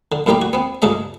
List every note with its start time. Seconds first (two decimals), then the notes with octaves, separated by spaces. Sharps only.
0.12 D3
0.26 F#2 A2 G3 A#3 G4 A#5
0.42 F#4
0.53 B3 C4
0.82 C#2 G2 C#3 G#3 D#5 A#5